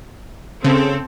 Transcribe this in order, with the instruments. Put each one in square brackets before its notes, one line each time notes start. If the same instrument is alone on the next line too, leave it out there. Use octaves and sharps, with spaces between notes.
[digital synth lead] C#3 [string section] C4 A4